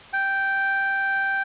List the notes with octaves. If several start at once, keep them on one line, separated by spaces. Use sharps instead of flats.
G5